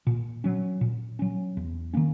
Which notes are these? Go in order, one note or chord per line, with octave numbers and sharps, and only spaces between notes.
A#2
F#3 C#4
A#2
F#3 C#4
E2
D#3 A#3 C#4